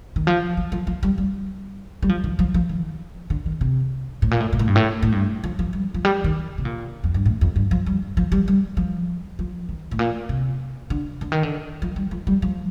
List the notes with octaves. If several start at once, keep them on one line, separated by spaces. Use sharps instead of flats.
D#3
F3
F3
F3
F3
G3
G3
G3
F3
D#3
F3
F3
D#3
D3
D#3
C3
A2
A#2
A2
A#2
A2
G2
A2
A2
G2
F3
F3
G3
F3
G3
D#3
C3
A#2
F2
G2
A2
F2
G2
F3
G3
F3
G3
G3
F3
F3
D#3
A2
A#2
C3
D3
D3
D#3
D3
F3
G3
F3
G3
F3